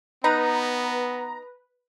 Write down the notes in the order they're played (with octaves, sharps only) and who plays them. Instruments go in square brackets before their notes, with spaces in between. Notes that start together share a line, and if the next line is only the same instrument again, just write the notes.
[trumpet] B3 [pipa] D#4 [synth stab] B4 [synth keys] A#5